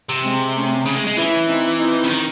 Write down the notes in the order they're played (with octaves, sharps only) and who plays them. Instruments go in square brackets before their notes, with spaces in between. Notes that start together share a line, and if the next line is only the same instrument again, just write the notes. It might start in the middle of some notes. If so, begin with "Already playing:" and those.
[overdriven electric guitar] C3
[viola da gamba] G#3 C4
A3 C#4
[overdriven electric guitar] C#3
G#3
G#3
[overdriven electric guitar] E3 [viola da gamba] C#4 E4
[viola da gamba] C4 D#4
C4 D#4
[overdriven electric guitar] C#3
D#3